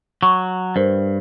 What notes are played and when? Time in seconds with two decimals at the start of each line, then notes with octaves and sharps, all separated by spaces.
0.23 F#3 C#6
0.76 G2 A#4 C5